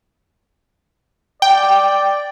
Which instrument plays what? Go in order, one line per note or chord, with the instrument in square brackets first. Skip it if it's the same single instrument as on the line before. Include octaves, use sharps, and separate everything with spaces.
[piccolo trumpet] D5 [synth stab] G5